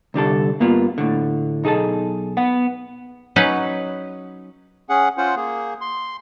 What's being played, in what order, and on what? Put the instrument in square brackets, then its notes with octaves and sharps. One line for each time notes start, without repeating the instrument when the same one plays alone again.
[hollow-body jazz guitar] C2 D3 G3 A4
G2 A#3 B3 F4
A2 D3
B1 D#4 G#4 A4 A5
B3 F#5
[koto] F#3 C#4 D#4 B4
[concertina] C#4 G#4 F#5
C#4 F4 C5 F#5
A#3 G#4
C6